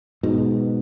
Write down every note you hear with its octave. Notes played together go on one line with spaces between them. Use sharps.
G#2 B2